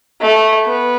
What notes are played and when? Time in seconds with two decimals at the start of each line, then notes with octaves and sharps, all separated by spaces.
0.21 A3
0.67 B3